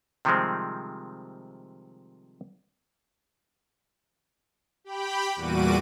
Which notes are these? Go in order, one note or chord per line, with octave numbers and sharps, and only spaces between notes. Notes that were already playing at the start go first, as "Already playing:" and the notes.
C3 D#3 F3 G3 G#3 C4
G4 G5 B5
E2 A#2 G3 F#4 D6 D#7